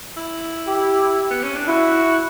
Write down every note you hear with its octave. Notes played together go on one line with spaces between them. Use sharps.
E4
G4
B3
C#4
D4
E4 F#4